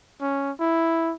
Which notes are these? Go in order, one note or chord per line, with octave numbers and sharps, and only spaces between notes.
C#4
E4